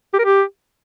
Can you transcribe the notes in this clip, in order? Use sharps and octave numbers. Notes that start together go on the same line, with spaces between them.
G4
A#4
G4